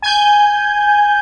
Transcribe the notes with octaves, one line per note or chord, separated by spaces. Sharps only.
G#5 G6